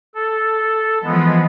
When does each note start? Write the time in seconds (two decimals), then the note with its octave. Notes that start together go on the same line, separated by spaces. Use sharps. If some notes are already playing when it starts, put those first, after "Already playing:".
0.15 A4
1.03 E3 F3 G#3 B3